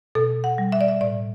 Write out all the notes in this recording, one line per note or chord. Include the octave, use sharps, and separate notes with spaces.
B2 A4
F#5
G3
E5
D5
E5
A2 D5